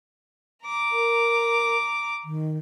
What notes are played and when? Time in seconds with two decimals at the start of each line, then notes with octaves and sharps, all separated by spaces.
0.64 A#5 D6
0.92 A#4
2.24 D#3